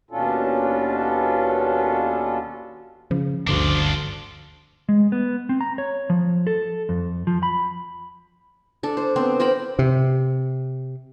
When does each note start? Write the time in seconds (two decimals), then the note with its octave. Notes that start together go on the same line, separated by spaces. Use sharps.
0.11 D#2 B2 C#4 D4 F4 A4
3.11 C#3 F3
3.47 G1 D2 D3 D4 F4
4.89 G#3
5.12 B3
5.49 C4
5.61 A#5
5.78 C#5
6.10 F3
6.47 A4
6.89 F2
7.27 F3
7.43 B5
8.83 D4 A4
8.97 C5
9.16 B3 C4 C5
9.40 A#4 C5 G5 B5
9.79 C3